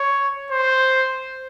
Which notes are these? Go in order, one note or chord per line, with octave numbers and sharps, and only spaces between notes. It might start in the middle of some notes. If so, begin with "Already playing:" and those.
Already playing: C#5
C5